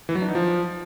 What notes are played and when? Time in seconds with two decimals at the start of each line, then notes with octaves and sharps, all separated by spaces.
0.09 E3
0.15 F#3
0.22 D4
0.28 D#4
0.35 F3